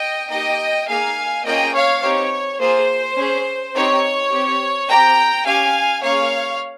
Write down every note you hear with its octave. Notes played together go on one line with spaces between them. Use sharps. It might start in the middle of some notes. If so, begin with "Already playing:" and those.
Already playing: D#5 G5
A#3 D#4 G4 D#5 G5
A#3 D#4 G#4 F5 G#5
A#3 C#4 F4 G#4 D#5 G5
C#5 F5
C4 D#4 G4 C#5
A#3 F4 G#4 C5
C#4 G#4
C4 D#4 G4 C#5
C4 G4
C4 G4 G5 A#5
C#4 G4 F5 G#5
A#3 C#4 G#4 C#5 F5